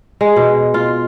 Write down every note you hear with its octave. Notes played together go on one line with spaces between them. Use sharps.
G#3
B2
F4